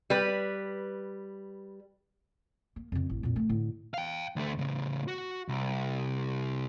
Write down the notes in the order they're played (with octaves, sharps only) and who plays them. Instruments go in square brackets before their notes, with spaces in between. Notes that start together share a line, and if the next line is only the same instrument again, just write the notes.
[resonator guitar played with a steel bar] G3 B4
[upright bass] A#3
F2 C#3
A1
F2 A#2
D#3 A3
A2 D3
[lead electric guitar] F5 G5
D2 A3
A2 C#3
F#4
C2